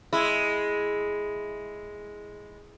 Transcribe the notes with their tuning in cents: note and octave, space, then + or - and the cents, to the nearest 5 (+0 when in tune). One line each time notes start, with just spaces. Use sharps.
G#3 +0 E4 +0